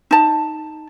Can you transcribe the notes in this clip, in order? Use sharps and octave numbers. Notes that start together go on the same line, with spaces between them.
D#4 A5